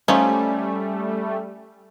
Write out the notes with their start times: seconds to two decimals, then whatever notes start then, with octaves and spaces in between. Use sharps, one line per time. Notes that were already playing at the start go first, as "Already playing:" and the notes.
0.08 F3 G3 A3 C#4 D#4